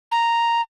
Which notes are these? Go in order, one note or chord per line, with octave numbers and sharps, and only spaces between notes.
A#5